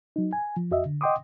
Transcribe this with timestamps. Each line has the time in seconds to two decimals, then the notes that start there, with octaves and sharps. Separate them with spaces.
0.16 F#3 D#4
0.33 G#5
0.57 F3
0.71 F2 F#4 D#5 E5
0.86 D3
1.01 D#5 F#5 G5 C6 D6 D#6